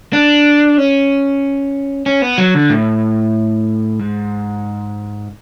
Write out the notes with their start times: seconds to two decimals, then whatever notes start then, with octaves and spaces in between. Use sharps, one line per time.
0.13 D4
0.78 C#4
2.06 C#4
2.22 B3
2.38 F#3
2.54 D3
2.70 A2
3.99 G#2